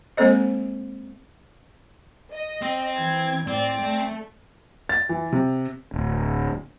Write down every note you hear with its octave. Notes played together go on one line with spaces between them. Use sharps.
G#3 A#3 C4 A4 C5 D#5
D#5
C4
E3 G#6
A2 C4 D5
A3
A6
E3
C3
D1